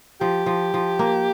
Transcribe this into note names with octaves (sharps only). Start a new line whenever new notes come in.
F3 G4
F3
F3
A#3